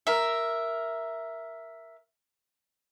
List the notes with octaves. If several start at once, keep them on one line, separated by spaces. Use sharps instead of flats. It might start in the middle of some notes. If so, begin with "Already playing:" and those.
A#4 E5